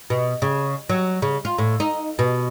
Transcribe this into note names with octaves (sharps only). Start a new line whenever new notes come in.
B2
C#3
F#3
C#3
F4
A2
D#4
B2